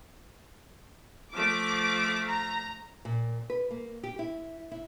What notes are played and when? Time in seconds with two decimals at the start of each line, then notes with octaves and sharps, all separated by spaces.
1.33 F3 A3 D6
2.27 A#5
3.05 A#2
3.50 B4
3.71 A#3
4.03 G4
4.19 E4
4.71 E4